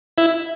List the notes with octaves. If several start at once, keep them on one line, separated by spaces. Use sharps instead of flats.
E4